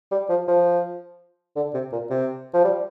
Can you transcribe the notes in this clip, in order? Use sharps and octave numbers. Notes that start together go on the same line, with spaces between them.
G3
F3
F3
D3
C3
A#2
C3
F3
G3